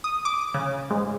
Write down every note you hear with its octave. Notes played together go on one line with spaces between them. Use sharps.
D#6
D6
C#3
G#2